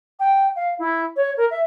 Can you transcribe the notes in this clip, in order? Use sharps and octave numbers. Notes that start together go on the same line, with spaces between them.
G5
F5
E4
C#5
A#4
E5